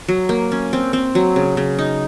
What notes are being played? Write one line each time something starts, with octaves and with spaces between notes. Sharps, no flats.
F#3
A#3
C#4
C4
C4
F#3
C#3
C#3
D#4